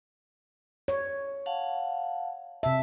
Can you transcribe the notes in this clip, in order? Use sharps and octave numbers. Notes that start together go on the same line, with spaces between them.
C#5
F5 F#5 A5
C3 E5 A5